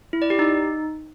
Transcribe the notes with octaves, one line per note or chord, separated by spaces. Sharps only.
E4
D5
G4
D#4